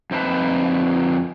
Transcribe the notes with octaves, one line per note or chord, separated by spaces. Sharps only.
F2 C4 D#4 B4 A5